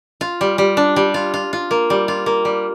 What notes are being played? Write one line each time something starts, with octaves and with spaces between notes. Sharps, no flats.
F4
G3
G3
D4
G3
F4
F4
F4
A#3
G3
F4
A#3
G3